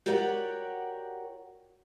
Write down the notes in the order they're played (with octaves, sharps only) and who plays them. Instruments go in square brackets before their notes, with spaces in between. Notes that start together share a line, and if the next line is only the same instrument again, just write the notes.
[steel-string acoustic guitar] F#4 G4 A#4 C#5 D5 F#5